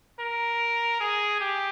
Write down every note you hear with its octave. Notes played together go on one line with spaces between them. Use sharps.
A#4
G#4
G4